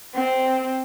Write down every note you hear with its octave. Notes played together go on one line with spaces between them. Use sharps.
C4